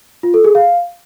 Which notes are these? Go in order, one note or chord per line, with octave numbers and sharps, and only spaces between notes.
F4
A4
G#4
F5